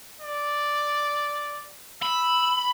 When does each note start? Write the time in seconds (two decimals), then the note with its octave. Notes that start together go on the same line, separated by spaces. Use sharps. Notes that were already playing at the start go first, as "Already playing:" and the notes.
0.21 D5
2.02 B5 E6